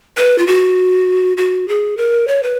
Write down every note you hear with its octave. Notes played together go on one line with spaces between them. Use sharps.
B4
F4
F#4
F#4
G#4
A#4
C#5
B4